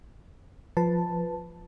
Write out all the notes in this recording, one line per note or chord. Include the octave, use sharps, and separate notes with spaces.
F3 B4 A5